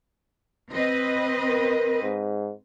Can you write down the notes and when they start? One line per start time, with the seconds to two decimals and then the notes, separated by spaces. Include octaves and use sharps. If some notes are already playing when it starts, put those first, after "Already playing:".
0.73 C4 B4 D#5
1.49 A#4
2.02 G#2